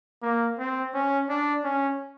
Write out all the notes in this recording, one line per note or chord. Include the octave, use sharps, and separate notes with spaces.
A#3
C4
C#4
D4
C#4